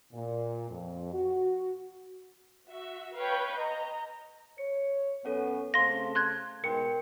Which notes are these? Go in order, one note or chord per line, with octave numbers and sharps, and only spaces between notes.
A#2
F2
F#4
F#4 E5
B4 C#5 F5 G5 C#6 G6
D#5 A#5
C#5 C#7
F#2 B3 C#4 A4 C#5 F#5
C#3 A3 C4 A4 C5 F5 C6 A#6
A5 C6 F#6 G#6
G#2 B2 A#4 G5 C6 C#7